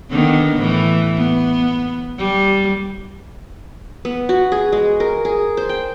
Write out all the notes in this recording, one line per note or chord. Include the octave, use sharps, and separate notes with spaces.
D3 D#3 B3
A2 E3
B3
G3
B3
F#4
G#4
G#3
A#4
G#4
C5
G5